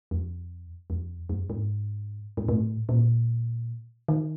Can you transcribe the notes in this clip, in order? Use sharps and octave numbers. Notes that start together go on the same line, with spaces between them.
F2
F2
F#2
G#2
G#2
A2
A#2
D#3